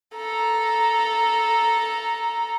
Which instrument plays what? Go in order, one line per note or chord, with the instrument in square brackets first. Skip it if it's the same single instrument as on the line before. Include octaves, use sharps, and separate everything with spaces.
[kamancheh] A4 A#5